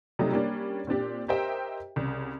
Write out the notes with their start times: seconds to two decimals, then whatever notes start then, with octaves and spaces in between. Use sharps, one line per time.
0.19 C3 F#3 G3 A3 D#4
0.32 G3 A#3 C#4 D4
0.87 A#2 C4 D4 G4
1.28 G4 A#4 C5 D#5 E5 G5
1.96 C2 C#3